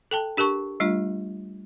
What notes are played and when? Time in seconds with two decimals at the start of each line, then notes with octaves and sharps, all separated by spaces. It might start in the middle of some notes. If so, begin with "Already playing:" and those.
0.11 A4 G5 A5
0.37 D4 G4 A#4 A5 C#6
0.80 G3 A3 D4 F4